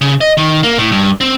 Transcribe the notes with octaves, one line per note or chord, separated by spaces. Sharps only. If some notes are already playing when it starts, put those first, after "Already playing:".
C#3
D#5
D#3
A#3
A2
G2
C4